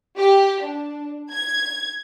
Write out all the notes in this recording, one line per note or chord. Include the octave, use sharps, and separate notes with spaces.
G4
D4
G#6